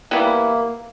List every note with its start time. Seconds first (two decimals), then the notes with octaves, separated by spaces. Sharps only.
0.11 E3 G3 A#3 B3 E4